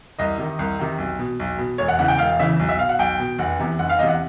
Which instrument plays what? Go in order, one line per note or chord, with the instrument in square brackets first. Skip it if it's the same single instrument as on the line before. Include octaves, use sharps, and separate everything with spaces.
[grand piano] C2 D#5
C3 D#3
C2
C3 D#3
B1
B2
B1
B2
E1 C#5
F#5
E2 C#3 E3 F#5
G5
E1 F5
E2 C#3 E3 E5
B1
E5
B2 F5
F#5
B1 G5
B2
F1 F#5
E2 C3
F1 F#5
F5
E2 C3 D#5
F#5